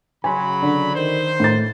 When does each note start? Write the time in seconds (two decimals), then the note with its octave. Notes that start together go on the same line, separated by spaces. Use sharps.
0.24 C#3 F#3 G#5 B5 C6
0.62 D3
0.94 D#3 C5
1.40 A2 A6